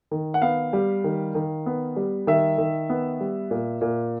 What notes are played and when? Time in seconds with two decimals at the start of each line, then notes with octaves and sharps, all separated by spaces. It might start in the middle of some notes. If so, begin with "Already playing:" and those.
0.11 D#3
0.34 F#5
0.42 B3 F5
0.73 G3
1.04 D#3
1.35 D#3
1.66 B3
1.96 G3
2.27 D#3 E5
2.58 D#3
2.90 B3
3.20 G3
3.51 A#2
3.81 A#2